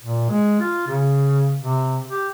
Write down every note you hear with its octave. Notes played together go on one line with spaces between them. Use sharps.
A#2
G#3
F4
C#3
C3
G4